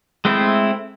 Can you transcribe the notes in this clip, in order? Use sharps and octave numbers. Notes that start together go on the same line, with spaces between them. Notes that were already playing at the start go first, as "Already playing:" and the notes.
G#3 A3 C4 E4